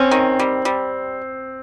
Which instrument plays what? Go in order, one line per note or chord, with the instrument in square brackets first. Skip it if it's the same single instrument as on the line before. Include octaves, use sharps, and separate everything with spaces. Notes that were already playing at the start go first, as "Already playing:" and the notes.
Already playing: [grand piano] C4 [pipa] C#4
[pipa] D#3
G3
G3